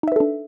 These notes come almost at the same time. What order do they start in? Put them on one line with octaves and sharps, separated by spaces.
D#4 E5 B4 A4 D4